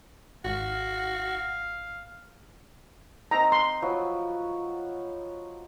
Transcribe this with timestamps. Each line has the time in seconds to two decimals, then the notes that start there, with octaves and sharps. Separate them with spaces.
0.45 G#1 F#4 F5
3.31 C4 D#4 A#5
3.52 C6
3.82 F3 F#3 B5